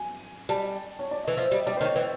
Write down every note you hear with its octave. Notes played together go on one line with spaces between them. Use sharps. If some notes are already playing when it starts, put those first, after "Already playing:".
Already playing: G#5
G3 A5
C#5
D5
E3 D#5
F3 E5
G3 D#5
G3 D5
C5
D#3 C#5
E3